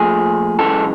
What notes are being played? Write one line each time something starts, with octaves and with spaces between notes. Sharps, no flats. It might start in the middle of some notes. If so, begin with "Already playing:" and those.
Already playing: A#2 F3 A3 G#4
F#2 C#3 E3 G#3 A4